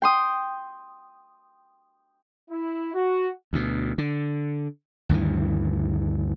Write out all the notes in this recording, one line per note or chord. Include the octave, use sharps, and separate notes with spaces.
G5 C6 D#6
E4
F#4
D2 B2
D3
D2 G2 D#3 E3